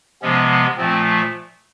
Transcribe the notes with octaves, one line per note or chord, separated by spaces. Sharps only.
C3 F3 G#3 B3 C#4
A#2 F3 A3 C4